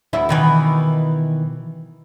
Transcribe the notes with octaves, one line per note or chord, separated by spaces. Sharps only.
D2 E4 E5
B2 D#3 E3